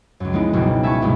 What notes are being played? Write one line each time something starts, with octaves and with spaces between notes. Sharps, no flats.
C#2 F#2
F3 G#3 B3 C4 D#4 E4
F#1 C#2 B2 F#4
E5 G#5 A5 B5 C#6
A#1 G2 C3 G#3